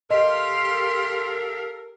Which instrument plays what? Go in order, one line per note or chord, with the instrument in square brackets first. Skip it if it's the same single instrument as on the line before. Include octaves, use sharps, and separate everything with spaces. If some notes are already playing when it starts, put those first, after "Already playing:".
[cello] G4 F5 [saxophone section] A4 A#4 [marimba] D#5 [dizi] C6